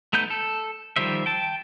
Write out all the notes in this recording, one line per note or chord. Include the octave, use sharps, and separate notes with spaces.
A3 B3 D#4 G6
A4
D#3 F3 G3 C5 E5
G5 A5